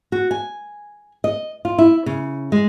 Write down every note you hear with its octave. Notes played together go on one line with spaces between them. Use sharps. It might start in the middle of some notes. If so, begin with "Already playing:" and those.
F#4
G#5
D#5
F4
E4
C#3
G#3